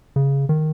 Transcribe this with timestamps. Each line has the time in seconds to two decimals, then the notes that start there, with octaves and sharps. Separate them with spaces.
0.16 C#3
0.49 D#3